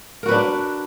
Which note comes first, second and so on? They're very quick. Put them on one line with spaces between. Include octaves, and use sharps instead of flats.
A#4 F#4 B4 D4